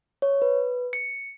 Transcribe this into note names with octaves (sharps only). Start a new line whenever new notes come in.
C#5
B4
C#7